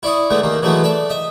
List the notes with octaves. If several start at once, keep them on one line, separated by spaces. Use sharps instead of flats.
E4 D5 C#6 D#6
D3 G#3 A3 B3
D#2 D#3 A#3
E3 F#3 G#3 A3 B3
A4 D5 E5
D#5 E5